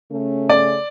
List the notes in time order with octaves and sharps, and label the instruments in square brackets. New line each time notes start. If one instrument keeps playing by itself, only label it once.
[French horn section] C#3 A3 C#4
[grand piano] D5